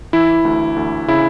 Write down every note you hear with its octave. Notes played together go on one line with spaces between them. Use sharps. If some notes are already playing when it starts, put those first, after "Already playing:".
E3 E4
D2
D2
C#3 E4